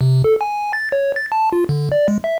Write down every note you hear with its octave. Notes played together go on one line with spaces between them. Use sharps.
C3
A4
G#5
A6
C#5
A6
A5
F4
D3
D5
G#3
E5